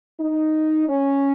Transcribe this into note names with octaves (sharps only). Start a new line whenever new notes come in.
D#4
C#4